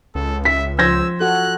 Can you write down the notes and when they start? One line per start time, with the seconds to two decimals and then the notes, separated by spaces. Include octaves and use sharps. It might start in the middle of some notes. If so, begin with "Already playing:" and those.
0.15 C#2 A4
0.45 E5 B6
0.79 F3 C5 E6 G6 G#6 A#6
1.20 F#4 A4 F#6